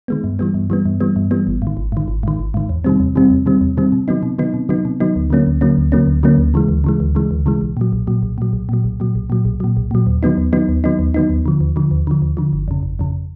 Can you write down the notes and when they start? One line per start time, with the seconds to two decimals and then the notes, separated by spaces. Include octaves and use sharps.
0.08 D#3 G#3 B3
0.24 G2
0.39 E3 G3 B3
0.54 G2
0.70 E3 G3 B3
0.86 G2
1.00 E3 G3 B3
1.16 G2
1.31 E3 G3 B3
1.47 G#1
1.62 G#2
1.67 D#3
1.77 G#1
1.92 G#2 D#3
2.08 G#1
2.23 G#2 D#3
2.39 G#1
2.54 G#2 D#3
2.69 E2
2.84 C3 D#3 G3 C4
3.00 E2
3.15 C3 D#3 G3 C4
3.31 E2
3.46 C3 D#3 G3 C4
3.61 E2
3.77 C3 D#3 G3 C4
3.92 C3
4.08 D#3 F#3 B3 D#4
4.23 C3
4.39 D#3 F#3 B3 D#4
4.54 C3
4.69 D#3 F#3 B3 D#4
4.85 C3
5.00 D#3 F#3 B3 D#4
5.16 D2
5.30 D3 F#3 A#3 C#4
5.47 D2
5.61 D3 F#3 A#3 C#4
5.77 D2
5.92 D3 F#3 A#3 C#4
6.07 D2
6.23 D3 F#3 A#3 C#4
6.38 D2
6.54 C#3 E3 G#3
6.68 D2
6.84 C#3 E3 G#3
7.00 D2
7.15 C#3 E3 G#3
7.31 D2
7.46 C#3 E3 G#3
7.61 B1
7.77 A#2 F#3
7.92 B1
8.07 A#2 F#3
8.23 B1
8.38 A#2 F#3
8.53 B1
8.69 A#2 F#3
8.84 B1
9.00 A#2 F#3
9.15 B1
9.30 A#2 F#3
9.45 B1
9.60 A#2 F#3
9.77 B1
9.91 A#2 F#3
10.07 D#2
10.23 D#3 F#3 B3 D#4
10.37 D#2
10.53 D#3 F#3 B3 D#4
10.69 D#2
10.84 D#3 F#3 B3 D#4
10.99 D#2
11.14 D#3 F#3 B3 D#4
11.30 D#2
11.46 D3 F3
11.61 D#2
11.76 D3 F3
11.91 D#2
12.07 D3 F3
12.22 D#2
12.37 D3 F3
12.53 G1
12.68 F2 C#3
12.83 G1
12.99 F2 C#3